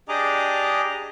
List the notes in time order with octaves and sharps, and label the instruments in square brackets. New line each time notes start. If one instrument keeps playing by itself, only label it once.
[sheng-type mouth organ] D4 G4 G#4 D#5 A#5 D6